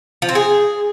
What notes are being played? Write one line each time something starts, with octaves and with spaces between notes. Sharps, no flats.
F3
C4
G#4